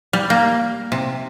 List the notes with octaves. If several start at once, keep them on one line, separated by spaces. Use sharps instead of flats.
G3
A#3
C3